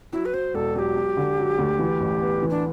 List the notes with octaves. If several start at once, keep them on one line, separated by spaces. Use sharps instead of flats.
F#3 E4
B4
F#3 C5
E1 A4
F#3 G4 A4
F#3
D3
F#3
D2
E3
A1
B3
E3
D4